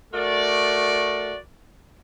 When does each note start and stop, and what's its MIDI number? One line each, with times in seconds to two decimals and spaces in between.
0.14 1.35 57
0.14 1.35 66
0.14 1.35 70
0.14 1.35 74